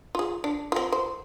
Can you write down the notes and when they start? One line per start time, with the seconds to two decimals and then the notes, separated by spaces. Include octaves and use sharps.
0.15 F4 G#4
0.44 D4
0.72 C4 F4
0.92 C5